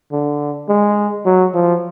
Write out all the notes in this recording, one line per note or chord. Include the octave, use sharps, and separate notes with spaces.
D3
G#3
F#3
F3